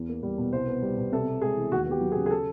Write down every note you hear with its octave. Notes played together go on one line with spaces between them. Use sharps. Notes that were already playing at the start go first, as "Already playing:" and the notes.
Already playing: E2
A#3
G3
B2
C2 C5
B3
G3
B2
C3 A4
B3
G#3 G#4
E3
D#2 F#4
B3
G4
F#3
G#4
C#3
G#4
A4